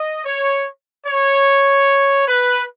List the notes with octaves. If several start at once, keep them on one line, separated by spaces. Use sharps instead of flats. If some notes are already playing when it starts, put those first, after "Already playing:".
Already playing: D#5
C#5
C#5
B4